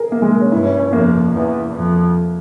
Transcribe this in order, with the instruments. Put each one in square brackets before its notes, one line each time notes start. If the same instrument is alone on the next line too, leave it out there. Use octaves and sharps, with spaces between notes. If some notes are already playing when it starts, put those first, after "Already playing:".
Already playing: [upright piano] G#4 A#4
A#3
G#3
A#3
C#4
[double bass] G2 [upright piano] E4
[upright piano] C#4
C#4
[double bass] F2 [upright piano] A#3
[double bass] E2
F2